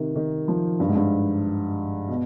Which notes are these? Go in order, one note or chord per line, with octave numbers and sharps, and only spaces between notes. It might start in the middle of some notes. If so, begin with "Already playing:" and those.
Already playing: C3 D#3
D#3
F3
G2
G#2
G2
B2